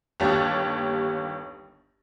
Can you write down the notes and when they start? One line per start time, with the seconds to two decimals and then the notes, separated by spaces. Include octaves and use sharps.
0.20 G1 D#2 G4 C#5 A5 A6